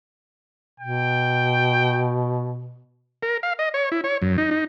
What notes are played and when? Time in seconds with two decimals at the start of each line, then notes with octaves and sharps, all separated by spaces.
0.80 B2 G5
3.23 A#4
3.43 F5
3.59 D#5
3.74 C#5
3.92 E4
4.04 C#5
4.22 F#2
4.38 D#4
4.51 D#4